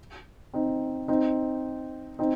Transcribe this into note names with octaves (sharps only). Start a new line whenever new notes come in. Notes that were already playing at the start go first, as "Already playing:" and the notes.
C4 D#4
C4 D#4
C4 D#4